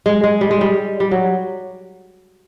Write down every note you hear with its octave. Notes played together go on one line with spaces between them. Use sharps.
G#3
G#3
G3
G#3
G3
G3
F#3